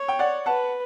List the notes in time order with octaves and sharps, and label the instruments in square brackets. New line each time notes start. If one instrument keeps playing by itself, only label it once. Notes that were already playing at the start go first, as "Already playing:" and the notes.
Already playing: [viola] C#5
[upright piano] G5
D5 F#5
[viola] B4 [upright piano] F#5 A5